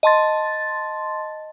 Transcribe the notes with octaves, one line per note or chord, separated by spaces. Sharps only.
D#5 A5 C6 A6